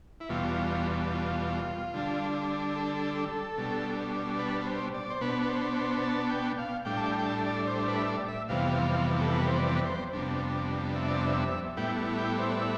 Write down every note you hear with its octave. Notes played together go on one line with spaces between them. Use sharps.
E4
E2 B2 G3 F4
F4
D3 G3 D4
A4
B2 G3 D4
B4
B4
C5
D5
C5
B2 B3 D4 B4
B4
C5
C5
A5
G5
F5
A2 G3 D4 G5
A5
G5
G5
A5
D5
C5
B4
E5
D5
E5
F2 C3 E3 G3 B3 F5
A4
B4
C5
D5
B4
C5
F2 C3 G3 B3 D4
E5
D5
E5
A2 G3 B3 E4 G5
G5
C5
D5
E5